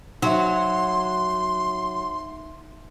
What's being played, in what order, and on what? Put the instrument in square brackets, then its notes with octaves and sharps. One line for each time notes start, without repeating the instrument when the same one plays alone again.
[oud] F#3 [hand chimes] D#4 E5 [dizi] C6